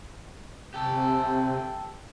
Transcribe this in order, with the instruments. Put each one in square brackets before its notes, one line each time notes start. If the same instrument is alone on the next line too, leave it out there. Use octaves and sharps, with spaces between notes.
[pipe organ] C3 [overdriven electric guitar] G4 A4